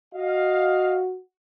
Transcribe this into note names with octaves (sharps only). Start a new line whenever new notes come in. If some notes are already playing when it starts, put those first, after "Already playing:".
F#4 D#5 F5